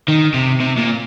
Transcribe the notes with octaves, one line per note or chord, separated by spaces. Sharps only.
D#3
C3
C3
A#2